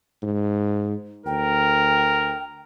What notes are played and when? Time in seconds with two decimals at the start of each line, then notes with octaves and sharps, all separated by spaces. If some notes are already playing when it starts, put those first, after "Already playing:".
0.22 G#2
1.26 D2 A#4 G5